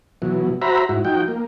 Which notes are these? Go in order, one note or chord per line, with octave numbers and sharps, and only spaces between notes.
B2 E3 F#3
F#4 C5 E5 A#5 B5
G#2 E4 F#4
F3 D#4 F#4 G5
A#3